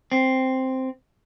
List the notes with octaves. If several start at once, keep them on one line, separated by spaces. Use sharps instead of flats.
C4